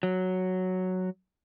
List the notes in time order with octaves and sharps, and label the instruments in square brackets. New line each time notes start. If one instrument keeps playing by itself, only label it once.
[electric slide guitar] F#3